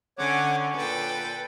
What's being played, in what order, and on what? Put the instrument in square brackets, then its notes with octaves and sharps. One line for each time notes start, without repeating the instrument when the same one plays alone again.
[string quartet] D3 C#4 [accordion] C#5 F#5 D6
[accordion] A#2 [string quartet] A4 B4 G5